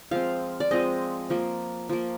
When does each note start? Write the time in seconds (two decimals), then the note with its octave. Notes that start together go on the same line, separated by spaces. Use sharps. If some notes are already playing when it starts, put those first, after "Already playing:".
0.11 F3 G#3 C4 F5
0.60 D5
0.71 F3 G#3 C4 D#5
1.30 F3 A#3
1.89 F3 A#3